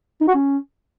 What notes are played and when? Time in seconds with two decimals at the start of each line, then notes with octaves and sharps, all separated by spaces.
0.21 D#4
0.28 F#4
0.35 C#4